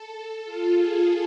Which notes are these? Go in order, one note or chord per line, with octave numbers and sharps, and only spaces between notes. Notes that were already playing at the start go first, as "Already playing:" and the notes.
Already playing: A4
F4
G#4